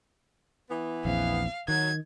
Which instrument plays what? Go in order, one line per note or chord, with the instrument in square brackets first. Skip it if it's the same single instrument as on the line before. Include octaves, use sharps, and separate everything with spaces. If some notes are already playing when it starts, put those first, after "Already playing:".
[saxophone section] E3 B3
[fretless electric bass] A#1 E2 C4 [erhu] F5
[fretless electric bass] D#3 [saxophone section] F#3 [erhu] G#6